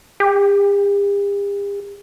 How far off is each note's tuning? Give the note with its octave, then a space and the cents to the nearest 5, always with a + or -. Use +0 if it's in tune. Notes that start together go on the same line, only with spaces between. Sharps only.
G4 +45